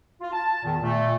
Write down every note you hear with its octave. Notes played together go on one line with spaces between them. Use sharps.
F4
A5
E2 A#2 D#3
A#2 A3